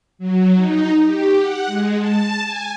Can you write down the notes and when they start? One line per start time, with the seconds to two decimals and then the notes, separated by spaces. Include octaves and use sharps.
0.19 F#3
0.55 D#4
1.03 G4
1.37 F#5
1.67 G#3
1.97 A5
2.42 G#5